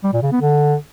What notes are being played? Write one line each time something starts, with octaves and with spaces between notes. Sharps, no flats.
G3
A#2
C#3
B3
D3